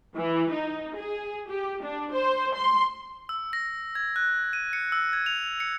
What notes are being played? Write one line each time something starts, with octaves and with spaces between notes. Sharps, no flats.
E3
D#4
G#4
G4
D4
C5
C6
E6
A#6
G#6
F#6
D#7
C#7
E6
G#6
F7
C#7